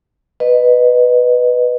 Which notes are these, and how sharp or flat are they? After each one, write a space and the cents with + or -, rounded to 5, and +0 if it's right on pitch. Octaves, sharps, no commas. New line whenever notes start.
B4 +0 D#5 -15